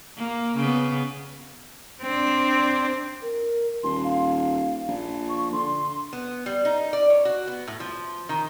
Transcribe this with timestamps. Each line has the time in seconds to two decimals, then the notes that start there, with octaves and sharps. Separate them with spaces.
0.16 A#3
0.57 C#3 B3
2.02 C4 D4
3.22 A#4
3.83 D#1 C6
4.04 F5
4.88 A#1
5.29 C#6
5.52 D3 C6
6.13 B3
6.46 G3
6.65 D#4
6.93 D5
7.10 C#5
7.25 F#4
7.47 B3
7.68 A2
7.80 F3
8.29 D#3